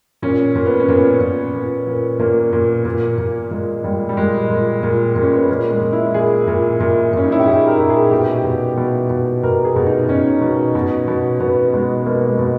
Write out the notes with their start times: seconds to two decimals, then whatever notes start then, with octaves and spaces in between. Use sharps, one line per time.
0.22 A#2 C#4
0.55 A#2
0.66 B3
0.80 C#4
0.88 A#2
0.95 B3
1.21 A#2
1.54 A#2
1.87 A#2
2.19 A#2 A#3
2.53 A#2
2.85 A#2
3.18 A#2
3.51 A#2 G#3
3.84 A#2 G3
4.09 G3
4.17 A#2 G#3
4.49 A#2
4.83 A#2
5.16 A#2
5.22 C#4
5.35 B3
5.48 A#2 A#3
5.70 G#3
5.81 A#2
5.93 E4
6.14 A#2 G#4
6.47 A#2
6.80 A#2
7.13 A#2 C#4
7.24 D#4
7.32 E4
7.39 G4
7.45 A#2 G#4
7.68 A#4
7.79 A#2
7.90 G#4
8.11 B2 G4
8.44 B2
8.77 B2
9.10 B2
9.43 B2 A#4
9.65 G#4
9.76 B2
9.86 D#4
10.09 B2 C#4
10.41 B2
10.75 B2
11.08 B2
11.40 B2 B3
11.73 B2 G#3
11.96 B3
12.06 B2 A#3
12.29 G#3
12.39 B2